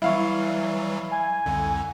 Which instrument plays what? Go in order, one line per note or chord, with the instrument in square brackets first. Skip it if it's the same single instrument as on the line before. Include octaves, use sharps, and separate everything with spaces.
[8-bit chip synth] E3 F#3 G3 [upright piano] E4 F5 C#6
[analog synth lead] G#5
[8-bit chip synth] C2 F2 D3